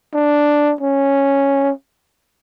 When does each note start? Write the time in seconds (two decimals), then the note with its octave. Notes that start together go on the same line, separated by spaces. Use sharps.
0.14 D4
0.81 C#4